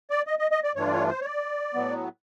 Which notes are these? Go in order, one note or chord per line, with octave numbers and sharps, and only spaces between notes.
D5
D#5
D#5
D#5
D5
G2 E3 A3 D4 F4 C#5
D5
C#5
C5
C#5
D5
A2 F#3 B3